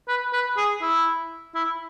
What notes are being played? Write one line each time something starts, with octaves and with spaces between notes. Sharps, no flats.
B4
B4
G#4
E4
E4